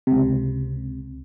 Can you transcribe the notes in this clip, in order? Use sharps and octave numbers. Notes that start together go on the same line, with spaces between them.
C#2 C3